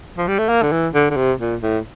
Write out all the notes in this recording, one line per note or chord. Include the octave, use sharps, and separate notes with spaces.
F3
G3
A3
A#3
D3
E3
D3
D3
C3
A#2
A2